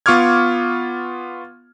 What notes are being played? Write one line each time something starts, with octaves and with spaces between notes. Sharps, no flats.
B3 F4 C#6 D6 F6 G#6